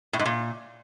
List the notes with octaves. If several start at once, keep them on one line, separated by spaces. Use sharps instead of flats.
A2
G#2
A#2